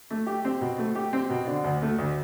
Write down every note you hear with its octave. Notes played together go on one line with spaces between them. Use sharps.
A3
G4
C4
B2
A3
G4
C4
B2
D3
D2
A3
D2